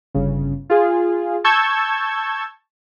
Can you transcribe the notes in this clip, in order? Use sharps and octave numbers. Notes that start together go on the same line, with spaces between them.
G1 C#3
F4 G#4
A5 C#6 E6 G6 G#6